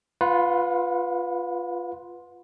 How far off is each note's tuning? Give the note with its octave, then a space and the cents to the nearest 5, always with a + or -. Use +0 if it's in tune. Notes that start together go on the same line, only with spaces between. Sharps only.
F4 +0 B4 +0 F#5 -40